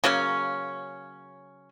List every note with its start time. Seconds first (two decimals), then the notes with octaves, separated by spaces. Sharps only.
0.04 C#3 F#3 A#3 C#4